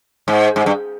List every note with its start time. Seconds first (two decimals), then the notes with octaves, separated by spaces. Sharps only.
0.28 G#2
0.56 G#2
0.66 G2